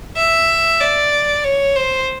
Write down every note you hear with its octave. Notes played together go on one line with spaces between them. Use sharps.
E5
D5
C#5
C5